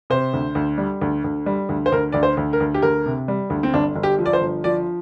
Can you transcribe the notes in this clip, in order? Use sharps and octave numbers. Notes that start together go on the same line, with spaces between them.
C3 C5
D2
D2
G3
D2
D2
G3
D2
C5
D2 A#4
D2 D5
C5
D2
A#4
D2
G4
D2 A#4
C3
G3
D2
C4
G1 D4
G1
G4
F3
D5
C5
G1
F3 D5